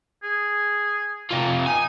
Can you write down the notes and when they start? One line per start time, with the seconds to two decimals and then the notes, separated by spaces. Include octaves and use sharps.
0.23 G#4
1.31 C3 F4
1.66 D#4 G#5